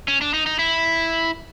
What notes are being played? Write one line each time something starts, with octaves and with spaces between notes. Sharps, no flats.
C#4
D4
D#4
D#4
E4